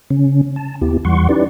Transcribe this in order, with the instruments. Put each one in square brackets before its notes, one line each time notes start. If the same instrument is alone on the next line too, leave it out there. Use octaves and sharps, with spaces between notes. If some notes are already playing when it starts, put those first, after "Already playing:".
[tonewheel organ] C#3 C#4
A5
D#2 B3 E4 G4
E2 E3 G3 F#5 C6 C#6
C#4 D#4 E4 G4 B4 D5